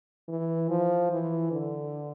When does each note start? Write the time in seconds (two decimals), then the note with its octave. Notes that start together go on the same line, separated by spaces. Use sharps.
0.28 E3
0.70 F3
1.11 E3
1.52 D3